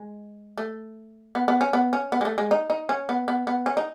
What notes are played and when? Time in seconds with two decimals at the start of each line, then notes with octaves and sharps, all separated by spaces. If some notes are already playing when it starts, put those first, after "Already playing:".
Already playing: G#3
0.57 A3
1.35 B3
1.48 B3
1.61 C#4
1.73 B3
1.93 C#4
2.12 B3
2.21 G#3
2.25 A3
2.38 G#3
2.51 D#4
2.70 D#4
2.89 C#4
3.09 B3
3.28 B3
3.47 B3
3.66 C#4
3.77 D#4